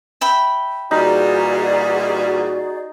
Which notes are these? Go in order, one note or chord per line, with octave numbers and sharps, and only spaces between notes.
E5 G5 B5
A#2 E3 G3 D#4 F#4 G#4 D5